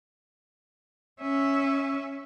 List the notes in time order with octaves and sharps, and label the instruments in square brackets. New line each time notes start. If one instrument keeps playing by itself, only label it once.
[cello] C#4 E5